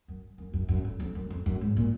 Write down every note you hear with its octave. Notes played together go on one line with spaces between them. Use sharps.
F#2
F#2
F#2
F#2
F2
F2
F#2
F2
F#2
G#2
A#2